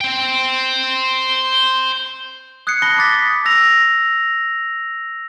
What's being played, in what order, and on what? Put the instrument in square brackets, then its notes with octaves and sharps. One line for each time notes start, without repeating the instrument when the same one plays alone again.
[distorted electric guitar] C5 G5
[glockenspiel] D#6 F#6 G#6 C7 C#7
A5 B5 D#6 A#6 C7 G7
D6 A6 B6 C#7
D#6 A6
E6 A#6 F7